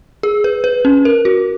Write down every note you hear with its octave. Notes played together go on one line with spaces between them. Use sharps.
G#4
B4
B4
C#4
A#4
F#4